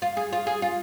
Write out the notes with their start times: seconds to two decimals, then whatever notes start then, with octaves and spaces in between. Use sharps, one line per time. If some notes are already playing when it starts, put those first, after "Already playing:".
0.02 F4
0.17 G#4
0.33 F4
0.47 G#4
0.62 F4